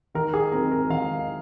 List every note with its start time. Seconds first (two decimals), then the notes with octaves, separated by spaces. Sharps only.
0.15 D#3 A#4
0.34 G#4
0.52 F#3 C4 A#4
0.72 A#4
0.89 D#3 F5